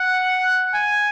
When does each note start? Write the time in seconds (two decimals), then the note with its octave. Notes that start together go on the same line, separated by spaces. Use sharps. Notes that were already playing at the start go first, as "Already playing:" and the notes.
Already playing: F#5
0.74 G#5